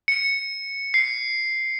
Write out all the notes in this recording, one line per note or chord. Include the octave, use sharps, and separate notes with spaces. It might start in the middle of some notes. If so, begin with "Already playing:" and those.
C#7
C7